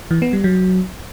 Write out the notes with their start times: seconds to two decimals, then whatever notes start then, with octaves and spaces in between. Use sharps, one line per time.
0.11 E3
0.22 B3
0.33 G3
0.44 F#3